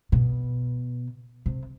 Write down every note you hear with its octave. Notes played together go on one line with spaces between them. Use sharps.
B2
C3